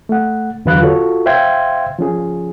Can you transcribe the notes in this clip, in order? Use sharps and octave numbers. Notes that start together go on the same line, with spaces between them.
A3 F#5
E2 D3 F#3 B4 F5 F#6
F4 F#4 A4 C#5
C5 E5 F5 G5 C6 G#6
F3 C#4 G#4